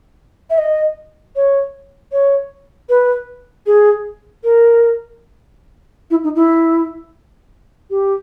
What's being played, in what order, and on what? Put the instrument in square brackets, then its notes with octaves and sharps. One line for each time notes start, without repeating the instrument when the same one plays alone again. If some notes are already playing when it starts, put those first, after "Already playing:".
[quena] E5
D#5
C#5
C#5
B4
G#4
A#4
E4
D#4
E4
G4